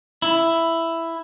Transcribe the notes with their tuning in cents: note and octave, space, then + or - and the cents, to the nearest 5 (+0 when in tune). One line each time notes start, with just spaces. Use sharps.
E4 +5